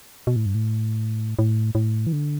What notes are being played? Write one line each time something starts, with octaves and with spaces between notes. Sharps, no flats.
B2
A2
G2
A2
A2
A2
E3
D3